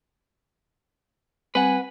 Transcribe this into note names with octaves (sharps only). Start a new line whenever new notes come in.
G3 C4 B4 F#5 G#5